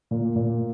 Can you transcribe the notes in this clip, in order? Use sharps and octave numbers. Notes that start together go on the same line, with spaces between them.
A#2
A#2